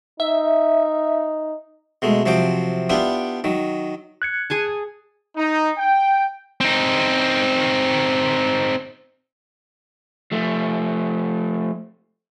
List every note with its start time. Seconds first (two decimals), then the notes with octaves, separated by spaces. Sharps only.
0.20 D#4 E5
2.02 B2 G#3 A3
2.26 C3 F3 F#3 G5 D6
2.89 B3 D4 E4 F4 G4
3.44 D#3 F#3
4.22 F#6 G#6 C#7
4.50 G#4 G#5 A5
5.37 D#4
5.78 G5
6.60 C4 D#4
10.32 F3 A3